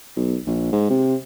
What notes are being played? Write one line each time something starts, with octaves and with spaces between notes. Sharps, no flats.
B1
A#1
G#2
C3